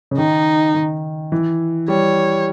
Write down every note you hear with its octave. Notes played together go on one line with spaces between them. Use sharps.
C#3
D#3 D#4
D#3
E3
G3 C#5